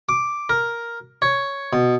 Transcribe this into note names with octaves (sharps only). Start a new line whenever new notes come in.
D6
A#4
C#5
B2